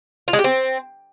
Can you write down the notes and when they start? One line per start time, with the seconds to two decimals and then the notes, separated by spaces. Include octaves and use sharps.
0.28 F4
0.33 G#3
0.39 G4
0.44 C4